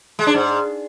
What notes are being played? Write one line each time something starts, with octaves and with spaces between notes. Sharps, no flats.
G#3
D4
G#2